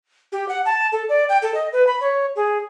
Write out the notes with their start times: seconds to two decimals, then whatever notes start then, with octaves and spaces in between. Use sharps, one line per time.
0.32 G4
0.49 F#5
0.65 A5
0.92 A4
1.09 D5
1.29 G5
1.42 A4
1.54 D#5
1.73 B4
1.87 B5
2.01 C#5
2.36 G#4